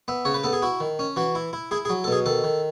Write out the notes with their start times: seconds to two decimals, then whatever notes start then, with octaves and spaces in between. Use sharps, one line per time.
0.08 B3 E5
0.25 C#3 C#5
0.34 B4
0.44 B3 A4
0.53 G#4
0.62 E4 F#4
0.80 D#3
0.99 C#4
1.16 E3 F#4
1.35 E4
1.53 E4
1.71 E4 G#4
1.85 G#4
1.90 F#3
2.04 A4
2.08 B2 G#4
2.26 D#3 A4
2.44 D#3